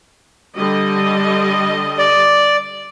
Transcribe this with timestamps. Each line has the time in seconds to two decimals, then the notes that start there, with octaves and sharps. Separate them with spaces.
0.56 D3 G3 D#5
1.99 D5